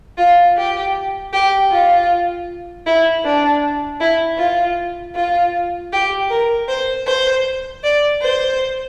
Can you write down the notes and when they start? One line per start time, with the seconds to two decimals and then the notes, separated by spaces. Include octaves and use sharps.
0.18 F4
0.57 G4
1.33 G4
1.72 F4
2.86 E4
3.25 D4
4.00 E4
4.38 F4
5.15 F4
5.93 G4
6.30 A#4
6.68 C5
7.07 C5
7.83 D5
8.22 C5